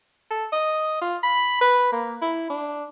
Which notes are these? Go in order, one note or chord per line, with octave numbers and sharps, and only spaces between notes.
A4
D#5
F4
B5
B4
A#3
E4
D4